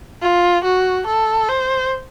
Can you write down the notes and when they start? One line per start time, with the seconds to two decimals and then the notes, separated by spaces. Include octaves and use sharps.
0.22 F4
0.64 F#4
1.07 A4
1.48 C5